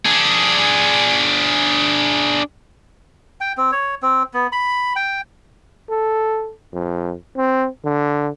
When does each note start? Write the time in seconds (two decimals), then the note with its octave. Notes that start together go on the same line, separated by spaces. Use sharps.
0.05 D4 G#4
3.41 G5
3.57 C4
3.72 C#5
4.02 C4
4.34 B3
4.52 B5
4.96 G5
5.90 A4
6.73 F2
7.37 C4
7.84 D3